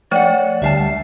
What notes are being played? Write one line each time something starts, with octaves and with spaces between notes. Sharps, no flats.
F3 A3 C#5 D5 F#5 G5
D2 D3 G3 E5 F5 A5